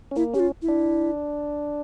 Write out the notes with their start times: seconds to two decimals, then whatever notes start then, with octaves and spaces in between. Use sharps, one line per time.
0.11 C#4
0.16 A#3 E4
0.34 C#4 G4
0.40 F4
0.62 E4
0.68 D4